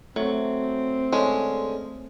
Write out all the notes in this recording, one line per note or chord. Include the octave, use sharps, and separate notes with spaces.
F#3 A3 C4
D3 G#3 C#4